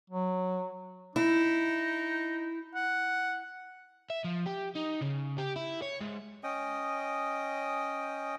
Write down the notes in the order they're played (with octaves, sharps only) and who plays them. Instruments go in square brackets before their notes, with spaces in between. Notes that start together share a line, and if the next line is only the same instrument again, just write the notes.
[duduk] F#3
[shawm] D#4 [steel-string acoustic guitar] E4
[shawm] F#5
[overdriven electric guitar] E5
F3
G4
D#4
C#3
G4
E4
C#5
G#2
[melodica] C#4 D#5 G5 D#6